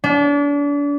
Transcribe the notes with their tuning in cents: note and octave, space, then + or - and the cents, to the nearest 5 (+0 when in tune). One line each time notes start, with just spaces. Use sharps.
D4 -35